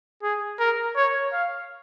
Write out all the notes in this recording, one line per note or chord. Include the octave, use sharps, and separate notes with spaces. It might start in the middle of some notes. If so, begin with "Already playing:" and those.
G#4
A#4
C#5
F5